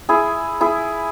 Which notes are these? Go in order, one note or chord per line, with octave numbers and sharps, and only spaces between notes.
E4 G#4
E4 G#4